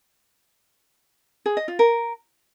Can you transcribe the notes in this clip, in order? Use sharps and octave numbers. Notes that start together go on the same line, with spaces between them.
G#4
D#5
F4
A#4